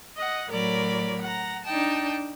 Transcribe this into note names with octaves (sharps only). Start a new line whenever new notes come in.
D#5 F#5
A2 F#3 A#4 D5 B5
F#5 A#5
D4 D#4 G5 A5